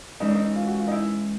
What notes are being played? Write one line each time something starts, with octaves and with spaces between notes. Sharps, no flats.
E3 G#3 C#4 D#4
D4
D#4
F4
F#4
F4
D#4
E4